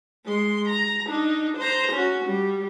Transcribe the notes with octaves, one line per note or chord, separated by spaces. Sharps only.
G#3 C6
A#5
D4 D#4
C5 A#5
C#4 F#4
G3